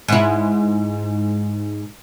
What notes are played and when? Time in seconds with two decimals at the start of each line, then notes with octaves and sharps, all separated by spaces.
0.08 G#2 E4